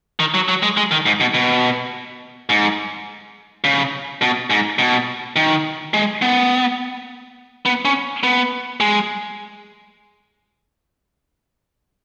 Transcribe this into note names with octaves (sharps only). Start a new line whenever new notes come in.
D#3
F#3
F#3
G#3
G#3
D#3
G#2
B2
B2
G#2
C#3
B2
G#2
B2
D#3
G#3
B3
B3
C#4
B3
G#3